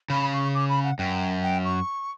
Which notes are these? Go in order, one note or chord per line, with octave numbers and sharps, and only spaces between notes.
C#3 B5
C#6
D6
B5
F#5
F#2 G5
G5
C#6